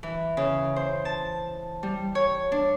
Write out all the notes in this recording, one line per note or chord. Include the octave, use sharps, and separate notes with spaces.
E3
C#3
C5
A5
G3
C#5
D4